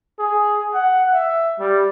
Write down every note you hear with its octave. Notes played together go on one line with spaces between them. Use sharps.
G#4
F#5
E5
G3